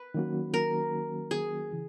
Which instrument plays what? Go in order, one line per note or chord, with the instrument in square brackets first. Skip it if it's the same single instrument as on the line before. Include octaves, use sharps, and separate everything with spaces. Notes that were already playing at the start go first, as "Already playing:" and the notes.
Already playing: [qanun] B4
[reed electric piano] D#3 F#3 A#3 C#4 F#4
[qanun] A#4
G#4
[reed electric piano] C#3 E3